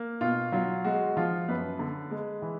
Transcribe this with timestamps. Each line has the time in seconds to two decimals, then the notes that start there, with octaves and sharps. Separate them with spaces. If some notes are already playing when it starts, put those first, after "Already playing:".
Already playing: A#3
0.21 B2 F4
0.52 F#3 F4
0.84 G#3 F#4
1.17 F3 F4
1.48 F#2 B4
1.79 D3
2.11 G#3
2.42 E3